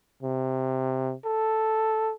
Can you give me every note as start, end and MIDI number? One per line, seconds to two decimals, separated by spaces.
0.23 1.14 48
1.25 2.12 69